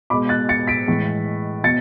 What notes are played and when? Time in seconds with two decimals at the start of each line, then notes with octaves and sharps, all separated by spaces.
0.10 B2 G#3 B5 D6
0.29 F#6 A6
0.49 A6 C#7
0.67 B6 D7
0.87 A2 E3 G#3
1.64 B2 A6 C#7